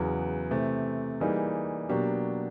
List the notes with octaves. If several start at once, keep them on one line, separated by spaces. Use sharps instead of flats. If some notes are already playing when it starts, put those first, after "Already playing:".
Already playing: E2 C#3 F#3 B3
C3 E3 A3 C4
E3 G3 A#3 D#4 G#4
B2 F#3 A#3 D4 G4